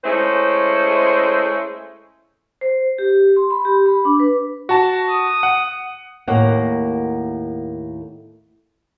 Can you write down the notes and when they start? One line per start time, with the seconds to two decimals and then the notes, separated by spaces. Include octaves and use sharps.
0.04 G#3 A3 C#4 E4 C5
2.61 C5
2.98 G4
3.36 C6
3.51 B5
3.65 G4
3.86 B5
4.05 D4
4.20 B4
4.69 F#4 A5
5.10 D#6
5.43 F#5
6.28 D#2 A2 A#3 A#4 F#5